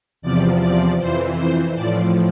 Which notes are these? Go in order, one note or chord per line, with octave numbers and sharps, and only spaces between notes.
E2 C3 F3 D5
D5
F2 E3 C5
C5
A2 F3 D5